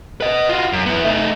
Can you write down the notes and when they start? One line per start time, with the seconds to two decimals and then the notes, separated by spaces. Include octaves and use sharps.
0.21 B4 D#5
0.49 F4 F#4
0.73 F#2
0.86 B3 E4
1.05 A3 D#4